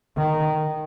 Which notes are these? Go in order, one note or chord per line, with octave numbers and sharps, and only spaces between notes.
D#3